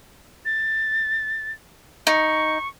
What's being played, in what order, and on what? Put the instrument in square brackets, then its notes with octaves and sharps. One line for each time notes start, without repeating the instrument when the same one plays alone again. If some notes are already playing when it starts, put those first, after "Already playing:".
[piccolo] A6
[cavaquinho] D#4 [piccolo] C#6